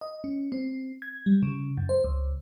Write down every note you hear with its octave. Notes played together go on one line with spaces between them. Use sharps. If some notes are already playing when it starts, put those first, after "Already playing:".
D#5
C#4
C4
G#6
G3
C#3
F#2
C5
C#2